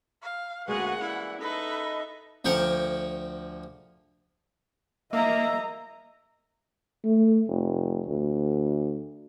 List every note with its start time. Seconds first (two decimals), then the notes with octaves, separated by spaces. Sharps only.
0.22 F5
0.68 D2 G#3 A#3 C#4 F#4 G#4 B4 F#5
1.01 E3 G3 E4
1.41 D#4 A4 B4 D#5 E5
2.45 D2 F3 A#4 G5 C#6
5.13 A#3 D#5 E5 A#5
7.04 A3
7.49 F1
8.08 D2